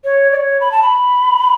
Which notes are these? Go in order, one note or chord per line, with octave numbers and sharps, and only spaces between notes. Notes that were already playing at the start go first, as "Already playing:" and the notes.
C#5
D5
C#5
B5
A5
B5